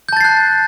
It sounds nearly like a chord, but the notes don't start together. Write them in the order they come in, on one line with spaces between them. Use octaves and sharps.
G6 A5 A6 C7 F#6